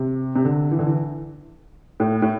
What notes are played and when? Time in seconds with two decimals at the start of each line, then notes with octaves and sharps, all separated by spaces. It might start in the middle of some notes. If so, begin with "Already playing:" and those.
Already playing: C3
0.36 C3
0.45 D3
0.71 E3
0.79 D3
0.87 E3
2.00 A2
2.22 A2